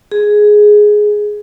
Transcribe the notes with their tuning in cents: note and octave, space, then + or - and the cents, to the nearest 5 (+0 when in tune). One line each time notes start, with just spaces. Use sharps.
G#4 +5